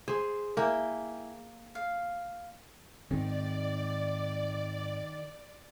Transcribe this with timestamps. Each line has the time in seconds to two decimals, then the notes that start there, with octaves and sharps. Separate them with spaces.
0.08 G#4 C5
0.57 A#3 E4 G5 G#5
1.75 F5
3.11 G#2 D#3 C4 D5